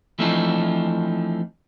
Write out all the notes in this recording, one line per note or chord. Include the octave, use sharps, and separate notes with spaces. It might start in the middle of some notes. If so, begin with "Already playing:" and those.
E3 F3 A3 C4 D4 D#4